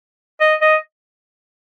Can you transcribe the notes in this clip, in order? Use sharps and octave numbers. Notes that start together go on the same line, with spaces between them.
D#5
D#5